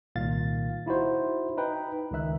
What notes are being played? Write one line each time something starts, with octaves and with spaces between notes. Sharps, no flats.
C2 A#2 D#3 F5 A6
D#4 E4 F#4 C5
D#4 B4 G5
C#2 D#3 D#4 E5 F#6